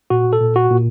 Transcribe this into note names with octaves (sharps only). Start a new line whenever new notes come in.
A#2 F#4
A4
A#2
F#4
A#2